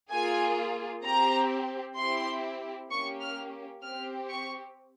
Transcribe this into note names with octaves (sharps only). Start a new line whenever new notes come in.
A#3 F4 G#4 G#5
C4 G4 A#5
C4 E4 G4 C6
A#3 C#4 G4 C#6
F6
C4 G4 F6
C#6